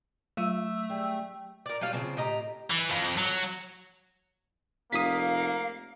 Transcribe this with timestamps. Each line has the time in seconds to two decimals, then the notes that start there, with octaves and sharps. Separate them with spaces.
0.37 F#3 A3 F4 E6
0.90 G3 G#4 G5
1.66 A#4 D5
1.81 F#3 G3 F4 F5
1.93 C#3 F3 C4
2.17 A2 G4 D#5 A#5
2.70 E3
2.90 F2
3.18 F#3
4.92 F1 A#3 F5 D#6 B6